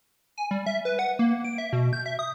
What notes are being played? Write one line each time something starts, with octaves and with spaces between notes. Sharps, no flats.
G#5
G3
E5
B4
F#5
A#3
D7
E5
B2
G6
E5
D#6